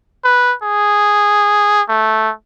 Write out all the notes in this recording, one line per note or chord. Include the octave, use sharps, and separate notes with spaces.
B4
G#4
A3